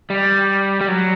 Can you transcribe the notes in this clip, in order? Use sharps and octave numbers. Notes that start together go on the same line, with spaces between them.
G3
G3
F#3